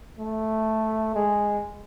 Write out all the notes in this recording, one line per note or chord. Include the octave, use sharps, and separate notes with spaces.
A3
G#3